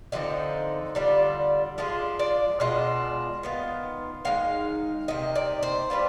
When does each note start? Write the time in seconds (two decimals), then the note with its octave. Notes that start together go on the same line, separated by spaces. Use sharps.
0.12 D3 F3 C4 D#4 D#5
0.95 D3 G3 D4 F4
1.78 F3 G#3 D4 F4
2.19 D5
2.60 B2 G#3 D4 F4 D#5
3.43 D#3 B3 F4
4.25 D#3 G#3 D#4 F5
5.08 C3 D#3 D#5
5.35 D5
5.63 C5
5.90 G3 D4 F4 B4